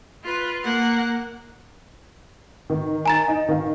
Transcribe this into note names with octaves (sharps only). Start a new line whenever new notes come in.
F4 B4
A#3 F#5
D#3
G#5 A#5 A6
D#4
D#3 F5